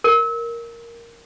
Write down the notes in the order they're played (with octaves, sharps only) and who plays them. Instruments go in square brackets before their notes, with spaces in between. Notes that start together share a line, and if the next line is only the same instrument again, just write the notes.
[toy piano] A#4